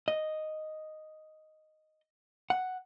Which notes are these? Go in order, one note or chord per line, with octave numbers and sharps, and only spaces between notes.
D#5
F#5